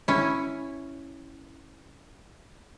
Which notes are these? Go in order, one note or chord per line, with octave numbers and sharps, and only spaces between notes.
C#4 E4